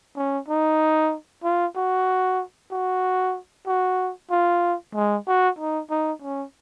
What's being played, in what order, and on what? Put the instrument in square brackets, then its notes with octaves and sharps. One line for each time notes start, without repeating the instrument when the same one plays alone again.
[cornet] C#4
D#4
F4
F#4
F#4
F#4
F4
G#3
F#4
D#4
D#4
C#4